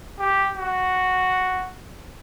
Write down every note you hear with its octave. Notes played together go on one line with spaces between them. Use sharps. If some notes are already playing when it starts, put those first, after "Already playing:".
G4
F#4